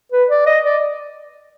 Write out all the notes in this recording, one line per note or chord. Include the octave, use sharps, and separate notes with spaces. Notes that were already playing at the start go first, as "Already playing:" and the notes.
B4
D5
D#5
D5